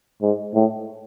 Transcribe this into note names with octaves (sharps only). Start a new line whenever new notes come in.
G#2
A2